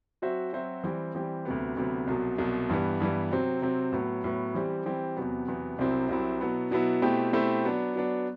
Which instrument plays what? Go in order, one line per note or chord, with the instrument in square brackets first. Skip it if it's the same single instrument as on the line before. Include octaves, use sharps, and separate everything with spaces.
[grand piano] F#3 C4 F#4 C5 E5
F#3 C4 F#4 C5 E5
E3 G3 C4 G4
E3 G3 C4 G4
D2 C3 F#3 B3
D2 C3 F#3 B3
C2 B2 F#3
C2 B2 F#3
G2 E3 G3 B3
G2 E3 G3 B3
C3 F#3 C4
C3 F#3 C4
A2 F#3 B3
A2 F#3 B3
E3 G3 C4 G4
E3 G3 C4 G4
E2 C3 F#3 B3
E2 C3 F#3 B3
C2 C3 F#3 C4 E4
C2 C3 F#3 C4 E4
B2 F#3 B3 E4
B2 F#3 B3 E4
B2 A3 C4 E4 G4
B2 A3 C4 E4 G4
F#3 B3 D4
F#3 B3 D4